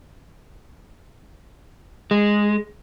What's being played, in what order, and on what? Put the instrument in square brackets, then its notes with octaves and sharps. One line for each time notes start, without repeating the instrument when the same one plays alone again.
[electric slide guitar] G#3